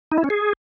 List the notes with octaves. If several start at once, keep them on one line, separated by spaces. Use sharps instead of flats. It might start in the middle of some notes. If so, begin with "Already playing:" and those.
D#4
E4
C#4
G#4